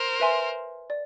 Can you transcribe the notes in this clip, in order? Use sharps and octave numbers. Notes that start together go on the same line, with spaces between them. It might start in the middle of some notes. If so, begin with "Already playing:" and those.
Already playing: A#4 C5
B4 E5 G#5 C6
D5